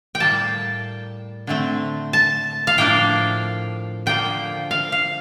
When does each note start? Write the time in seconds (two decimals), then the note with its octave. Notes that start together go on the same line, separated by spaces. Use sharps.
0.15 G5
0.20 A2 G3 A#3 A5
1.47 D3 A3 C4
2.13 A5
2.67 F5
2.78 A2 F3 A#3 D4 G5
4.06 D3 F3 A#3 G5
4.71 F5
4.92 F5